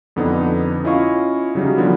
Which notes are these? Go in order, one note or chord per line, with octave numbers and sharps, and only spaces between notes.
F2 D3 B3 D4 D#4
C#4 E4 F4 D#5 F5 C#6
C#3 F#3 G3 D#4
D3 F3 G3 B3